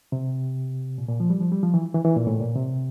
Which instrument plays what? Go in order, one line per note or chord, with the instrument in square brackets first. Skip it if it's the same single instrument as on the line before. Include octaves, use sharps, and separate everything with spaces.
[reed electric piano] C3
A#2
A#2
F3
G3
F3
G3
F3
E3
E3
E3
A#2
A2
A#2
C3